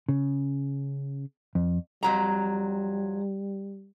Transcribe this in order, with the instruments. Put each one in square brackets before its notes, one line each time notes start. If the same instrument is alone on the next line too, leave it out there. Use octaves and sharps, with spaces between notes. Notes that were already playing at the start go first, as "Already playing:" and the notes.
[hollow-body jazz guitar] C#3
F2
[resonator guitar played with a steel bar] F2 F#3 A#5 [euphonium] G3